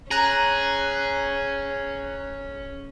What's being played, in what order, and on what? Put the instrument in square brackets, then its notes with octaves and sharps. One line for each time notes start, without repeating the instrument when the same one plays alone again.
[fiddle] C#4 [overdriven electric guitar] G#4 [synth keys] A#5 F#6